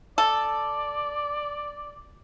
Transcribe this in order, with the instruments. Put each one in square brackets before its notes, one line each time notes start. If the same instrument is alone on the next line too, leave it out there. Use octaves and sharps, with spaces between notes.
[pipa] A4 [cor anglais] D5